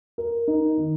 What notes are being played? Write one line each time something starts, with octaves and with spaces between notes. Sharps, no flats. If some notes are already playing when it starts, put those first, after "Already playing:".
A#4
D#4
D#3